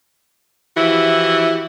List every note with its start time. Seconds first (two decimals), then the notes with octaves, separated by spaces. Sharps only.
0.77 E3 F3 E4 F#4 G4